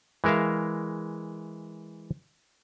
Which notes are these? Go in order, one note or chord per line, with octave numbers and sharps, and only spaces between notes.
E3 G#3 A#4 E5 F5